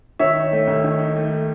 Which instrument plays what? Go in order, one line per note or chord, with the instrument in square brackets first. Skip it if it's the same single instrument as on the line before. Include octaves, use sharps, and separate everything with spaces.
[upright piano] D#3 [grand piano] C#5 E5
[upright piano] D#4
A3
D#2
D#3
D#4
A3